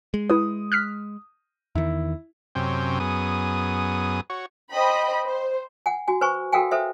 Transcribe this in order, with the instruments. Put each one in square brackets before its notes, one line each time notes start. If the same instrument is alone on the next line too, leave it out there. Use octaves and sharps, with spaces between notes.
[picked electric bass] G#3
[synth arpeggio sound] E4 B4 [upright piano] D#6
[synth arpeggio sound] F6 F#6 B6
[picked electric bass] E2 D#3 [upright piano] E4
[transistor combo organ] F#2 C3 C#4 C5 G5
F#2 B3 G#4 D#6
F#4 C#5
[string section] C5 D#5 G5 B5
C5
[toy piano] F#5 G#5
F#4 G#5
B4 C5 G#5 C#6
F#4 A4 A#4 F5 G5 G#5
A4 B4 C5 E5